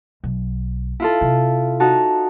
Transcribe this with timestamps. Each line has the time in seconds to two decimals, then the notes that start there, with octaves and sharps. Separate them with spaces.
0.24 B1
1.00 E4 F4 A4
1.21 C3
1.80 D#4 F#4 A5